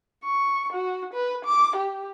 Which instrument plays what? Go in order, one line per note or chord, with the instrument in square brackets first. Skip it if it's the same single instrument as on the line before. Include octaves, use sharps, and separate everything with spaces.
[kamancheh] C#6
F#4
B4
D6
G4